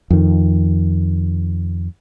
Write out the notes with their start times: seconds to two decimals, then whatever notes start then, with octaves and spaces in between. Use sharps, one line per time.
0.10 F2 D#3